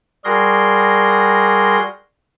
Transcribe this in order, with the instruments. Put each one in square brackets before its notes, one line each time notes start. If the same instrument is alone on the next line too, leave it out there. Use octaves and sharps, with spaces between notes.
[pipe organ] G3 F#4 G#4 A#4 C6 A#6